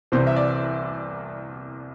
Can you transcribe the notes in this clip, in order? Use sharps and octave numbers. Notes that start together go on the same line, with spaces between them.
C2 C3 E3 C5
E5
D5